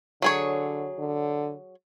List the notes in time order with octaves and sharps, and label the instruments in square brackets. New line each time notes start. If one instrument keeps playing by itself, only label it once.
[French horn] D3 [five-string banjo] F#3 G#4 C#5
[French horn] D3